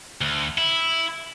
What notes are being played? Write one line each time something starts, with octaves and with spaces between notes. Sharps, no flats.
D2
E4